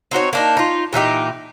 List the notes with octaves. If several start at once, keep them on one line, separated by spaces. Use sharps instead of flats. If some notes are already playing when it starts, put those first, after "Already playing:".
C4 D#4 F#4 C#5
A#3 D4 D#4
D#4 F4
A#2 E3 D#4 G4